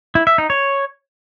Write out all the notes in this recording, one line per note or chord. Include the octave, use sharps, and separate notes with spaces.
E4
E5
D#4
C#5